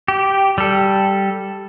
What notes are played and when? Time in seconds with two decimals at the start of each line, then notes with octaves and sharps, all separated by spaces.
0.08 G4
0.58 G3 A4